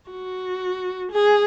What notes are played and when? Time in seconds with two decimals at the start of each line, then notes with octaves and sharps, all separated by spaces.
0.11 F#4
1.12 G#4